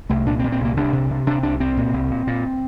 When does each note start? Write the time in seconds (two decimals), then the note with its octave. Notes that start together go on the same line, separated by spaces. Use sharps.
0.10 C2 A3
0.26 A#2 D4
0.39 C4
0.44 A#2
0.52 C4
0.60 C2 A#3
0.77 C2 D4
0.93 C3
1.11 C3
1.27 C3 D4
1.43 C2 D4
1.60 C3 C4
1.77 A#2
1.94 C2
2.10 A#2
2.27 A#2